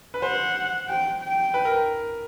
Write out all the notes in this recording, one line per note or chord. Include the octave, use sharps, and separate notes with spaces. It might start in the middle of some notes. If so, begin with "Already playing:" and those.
B4
C5 F#5
G5
G5
B4
A#4